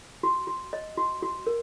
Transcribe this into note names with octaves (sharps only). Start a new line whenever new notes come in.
F#4
F#4
D#5
F#4
F#4
A#4